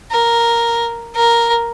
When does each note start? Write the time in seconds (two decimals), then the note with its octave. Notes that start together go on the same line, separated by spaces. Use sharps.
0.11 A#4
1.16 A#4